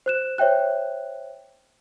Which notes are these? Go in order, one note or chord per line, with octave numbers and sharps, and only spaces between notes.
C5 F#6 E7
C5 C#5 E5 G5 F#6